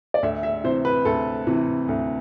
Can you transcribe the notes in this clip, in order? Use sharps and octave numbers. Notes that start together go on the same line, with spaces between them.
D5
D2 E5
E5
C3 E3 C5
B4
D2 A4
C3 E3
D2